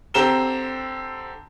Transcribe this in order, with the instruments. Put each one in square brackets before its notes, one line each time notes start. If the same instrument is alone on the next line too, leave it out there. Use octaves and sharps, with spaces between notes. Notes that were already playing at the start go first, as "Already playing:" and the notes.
[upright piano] D3 C4 G4 A#5 E7 G7